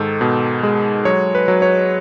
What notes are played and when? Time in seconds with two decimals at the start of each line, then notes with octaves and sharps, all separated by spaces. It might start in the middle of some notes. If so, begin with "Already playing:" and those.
Already playing: G#2 D#3 A4
0.21 B2
0.63 G#3
1.05 F#3 C#5
1.35 B4
1.48 F#3
1.62 C#5